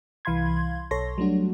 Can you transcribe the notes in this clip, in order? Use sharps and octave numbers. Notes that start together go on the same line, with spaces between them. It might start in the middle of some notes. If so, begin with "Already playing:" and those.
C2 E3 F5 B5 C6 G#6
B1 A4 C#5 C6 A#6
F#3 G3 A3 D4 F#4